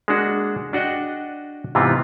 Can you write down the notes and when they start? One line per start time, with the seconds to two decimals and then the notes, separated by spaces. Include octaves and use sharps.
0.08 G#3 A#3 D4 F#4
0.73 D4 F#4 D5 D#5 G5
1.75 G#2 C3 E3 B3 C4 F4